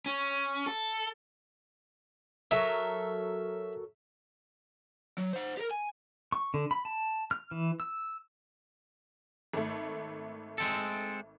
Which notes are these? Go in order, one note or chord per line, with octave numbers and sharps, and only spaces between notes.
C#4
A4
F#3 A4 A#4 E5
F#3
C5 F#5
G4 A#4
G#5
C#6
D3
B5
A5
F6
E3
E6
G#1 A3
G#3 C4 A4